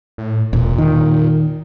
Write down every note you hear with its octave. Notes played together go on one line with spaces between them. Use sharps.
A2
E1 A#2
D#3